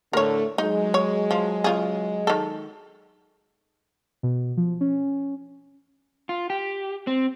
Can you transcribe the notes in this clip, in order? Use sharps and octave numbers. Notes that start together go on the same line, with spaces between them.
A2 D3 A3 A#4 C#5
F#3 G#3 D#4
C#5
F3
C#3 F4 G#4
D#3 A4
B2
F3
C#4
F4
G4
C4